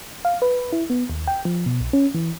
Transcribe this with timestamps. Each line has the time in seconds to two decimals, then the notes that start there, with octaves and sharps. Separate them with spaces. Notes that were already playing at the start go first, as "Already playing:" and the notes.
0.25 F5
0.42 B4
0.73 E4
0.90 B3
1.10 D#2
1.27 G5
1.45 F3
1.66 B2
1.81 B1
1.93 C#4
2.14 E3